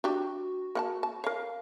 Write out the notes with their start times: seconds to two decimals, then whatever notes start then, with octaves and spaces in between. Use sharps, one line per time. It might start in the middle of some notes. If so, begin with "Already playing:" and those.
0.04 D4 F#4 G4
0.75 A#3 F#5 A5
1.03 A5
1.24 A#4 C#5 F5